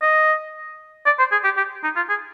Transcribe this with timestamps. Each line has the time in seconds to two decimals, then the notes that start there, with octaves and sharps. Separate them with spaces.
0.02 D#5
1.06 D5
1.19 C5
1.32 G#4
1.44 G4
1.57 G4
1.84 D#4
1.96 F4
2.10 G#4